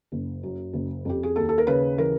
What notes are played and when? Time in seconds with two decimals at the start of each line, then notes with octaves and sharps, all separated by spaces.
0.12 F#1
0.43 F#2
0.73 F#1
1.05 F2 G4
1.23 G#4
1.36 D#2 A4
1.49 A4
1.58 A#4
1.67 C#3 B4
1.98 E3 A#4